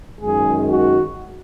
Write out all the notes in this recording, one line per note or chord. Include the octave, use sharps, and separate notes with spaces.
F#2 D#3 G#3 G#4
F#4